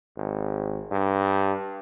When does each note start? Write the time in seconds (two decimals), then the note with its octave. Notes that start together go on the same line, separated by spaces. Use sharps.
0.17 G#1
0.92 G2